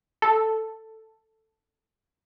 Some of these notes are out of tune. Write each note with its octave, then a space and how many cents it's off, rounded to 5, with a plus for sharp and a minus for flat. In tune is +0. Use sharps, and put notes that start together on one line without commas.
A4 +0